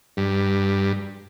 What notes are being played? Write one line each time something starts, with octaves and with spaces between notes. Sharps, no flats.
G2